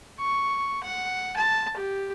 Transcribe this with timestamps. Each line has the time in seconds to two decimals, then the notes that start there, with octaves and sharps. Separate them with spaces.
0.20 C#6
0.83 F#5
1.36 A5
1.76 G4